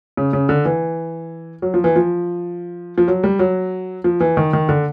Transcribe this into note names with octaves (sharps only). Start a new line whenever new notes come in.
C#3
C#3
D3
E3
F#3
F3
E3
F3
F3
F#3
G3
F#3
F3
E3
D#3
D#3
D3